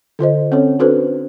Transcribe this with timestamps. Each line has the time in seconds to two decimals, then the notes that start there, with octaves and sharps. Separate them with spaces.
0.19 D3 F4 C5 D#5
0.52 C4 C#4 A4 C#5
0.79 D4 F#4 A4 B4 C5